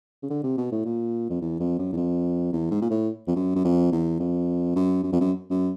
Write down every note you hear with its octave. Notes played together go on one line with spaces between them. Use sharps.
C#3
D3
C3
B2
A2
A#2
F2
E2
F2
F#2
E2
F2
E2
G#2
A#2
A2
F2
F#2
F#2
F2
E2
F2
F#2
F#2
F2
F#2
F#2